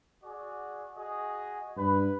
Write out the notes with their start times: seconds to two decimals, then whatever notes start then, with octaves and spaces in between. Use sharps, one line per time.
0.24 F#4 G#4 D5
0.97 F#4 G#4 D#5
1.77 G2 B4